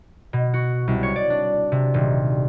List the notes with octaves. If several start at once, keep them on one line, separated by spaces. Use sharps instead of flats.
B2
F#4
C2
C#5
D5
D4
C3
D#1